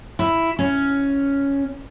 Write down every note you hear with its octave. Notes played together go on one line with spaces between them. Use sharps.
E4
C#4